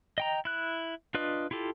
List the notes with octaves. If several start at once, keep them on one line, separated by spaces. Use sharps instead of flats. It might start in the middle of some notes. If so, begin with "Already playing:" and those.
D#5 G5 A#5
E4 F#6
D4 F4 B4 D#5
E4 F4 G4 A4